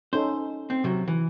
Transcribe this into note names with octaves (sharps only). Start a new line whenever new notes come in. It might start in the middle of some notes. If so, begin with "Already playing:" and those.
C#4 D#4 A4 C5
C4
C3 F#3
E3